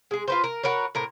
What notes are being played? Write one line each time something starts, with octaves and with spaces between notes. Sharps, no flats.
G#3 G#4
F4 B4 C5
A#4
F#4 A#4 B4 C#5
A2 A#4 C5